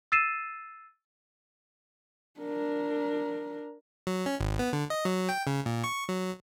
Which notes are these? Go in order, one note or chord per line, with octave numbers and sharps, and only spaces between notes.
E6 A6 C7 D#7 E7
D4 A#4
F#3
C#4
G#1
B3
D3
D#5
F#3
G5
C#3
A#2
C#6
F#3